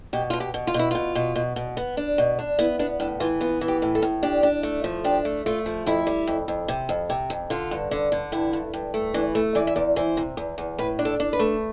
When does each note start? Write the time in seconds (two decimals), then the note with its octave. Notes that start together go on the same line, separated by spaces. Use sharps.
0.13 B2 G4
0.30 B2 F4
0.40 G4
0.54 B2
0.67 F4
0.74 B2
0.79 E4
0.91 B2 F4
1.15 B2
1.36 B2
1.56 B2
1.77 B3
1.97 D4
2.18 B2
2.39 D4
2.59 B3 E4
2.79 B3 D4
3.00 A2 D4
3.20 E3 F4
3.41 B3 F4
3.61 E3
3.68 G4
3.82 A2
3.95 A4
4.02 A2
4.23 D4 G4
4.43 D4
4.63 A3
4.84 F3
5.04 D4 G4
5.25 A3
5.46 A3 F4
5.66 F3
5.86 F2 E4
6.07 G3
6.27 F2
6.48 F2
6.68 C3
6.89 F2
7.10 C3
7.30 F2
7.50 D3 F4
7.71 G2
7.91 D3
8.12 D3
8.32 G2 E4
8.53 G2
8.74 G2
8.94 A3
9.14 E3 D4
9.35 A3 E4
9.55 E3 D5
9.67 E5
9.76 E2 D5
9.96 E3 C5
10.17 C3
10.37 E2
10.58 E2
10.79 A2 B4
10.99 D4
11.05 A4
11.20 D4
11.33 B4
11.39 A3